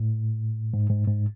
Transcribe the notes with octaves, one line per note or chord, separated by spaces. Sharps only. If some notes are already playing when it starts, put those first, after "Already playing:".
Already playing: A2
G#2
G#2
G#2